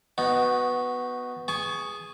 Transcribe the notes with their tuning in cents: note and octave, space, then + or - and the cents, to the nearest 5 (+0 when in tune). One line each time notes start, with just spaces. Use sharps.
B3 +5 D#4 +5 F#4 -10
G#4 -5 A5 -40 C#6 +10